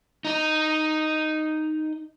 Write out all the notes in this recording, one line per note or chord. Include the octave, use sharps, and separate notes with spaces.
D#4 D#5